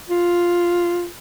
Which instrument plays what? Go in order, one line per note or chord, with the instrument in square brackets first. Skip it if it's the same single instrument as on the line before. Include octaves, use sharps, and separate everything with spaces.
[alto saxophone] F4